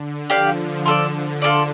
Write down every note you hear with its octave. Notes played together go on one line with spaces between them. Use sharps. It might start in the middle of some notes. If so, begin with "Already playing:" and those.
Already playing: D3
F3 G4 D5 F5
D3 F4 A4 D5
F3 F4 A4 D5